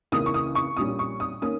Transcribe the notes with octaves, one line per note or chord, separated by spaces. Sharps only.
C#2 C#3 E3 A#3 D#6
C#6
D#6
C#6
A#1 A#2 G3 C#4 D#6
C#6
D#6
D#3 A#3 C#4 D#6